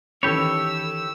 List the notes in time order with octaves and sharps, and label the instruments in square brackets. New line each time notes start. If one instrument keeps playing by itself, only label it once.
[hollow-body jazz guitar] D#3 E3 C#4 [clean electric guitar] G4 C#5 [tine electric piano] A4 B5 [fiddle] E6